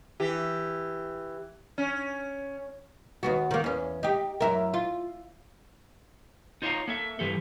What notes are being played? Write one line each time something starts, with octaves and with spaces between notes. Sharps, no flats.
E3 G4
C#4
D#2 B3 F#4
D#3 A#3
E2 C#4
D#4 G4
F#2 E4 A#4
F4
D#4 F4 C#5 E5 F5 A#5
A#3 A4 E5
G2 C3 E3 G4 A4